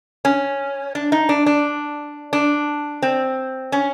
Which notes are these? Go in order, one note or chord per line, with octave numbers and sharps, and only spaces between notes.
C#4
D4
D#4
D4
D4
D4
C4
C#4